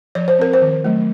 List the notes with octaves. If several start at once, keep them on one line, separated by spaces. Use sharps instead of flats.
F3 C#5
C5
C4 A#4
C5
D#3
F#3 A3